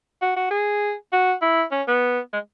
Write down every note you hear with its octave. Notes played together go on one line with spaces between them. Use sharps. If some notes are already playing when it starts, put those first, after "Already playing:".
F#4
F#4
G#4
F#4
E4
C#4
B3
G#3